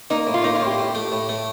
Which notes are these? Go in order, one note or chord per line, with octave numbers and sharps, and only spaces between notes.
A#3 D#4
A2
F4
A#3 D#4
F4
A2
G4
A2
A3
A2
A3